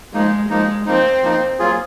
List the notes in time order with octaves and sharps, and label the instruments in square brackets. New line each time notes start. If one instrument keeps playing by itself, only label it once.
[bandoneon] F3 A#3 D#4 [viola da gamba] G#3
[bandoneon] F3 A#3 D#4 [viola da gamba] G#3
[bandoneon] F3 A#3 D#4 [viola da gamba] C4
[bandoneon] F3 A#3 D#4
F#3 A#3 F4 G#4